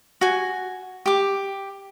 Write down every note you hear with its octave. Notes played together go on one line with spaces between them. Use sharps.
F#4 G#5
G4 D6